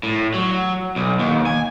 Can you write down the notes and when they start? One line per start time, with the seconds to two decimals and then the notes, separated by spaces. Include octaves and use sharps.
0.03 A2
0.34 F#3
0.96 B1
1.19 D#2
1.46 G#5